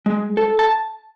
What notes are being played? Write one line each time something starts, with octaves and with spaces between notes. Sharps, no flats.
G#3
A4
A5